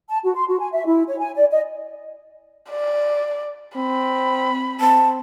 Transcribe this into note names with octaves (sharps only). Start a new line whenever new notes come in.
A5
F#4
C6
F#4
G#5
E5
E4
C#5
G#5
D5
D#5
D5
C4 B5
C4 A5